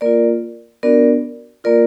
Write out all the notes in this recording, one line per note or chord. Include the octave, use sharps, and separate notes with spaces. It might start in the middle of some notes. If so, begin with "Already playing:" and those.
A#3 F4 A#4 D5
B3 D4 F#4 A#4 D5
A#3 F4 A#4 D5